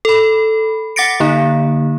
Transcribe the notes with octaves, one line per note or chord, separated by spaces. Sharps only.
A4 B5
F#5 D6 A6 A#6 C#7 D7
D3 A#3 D#4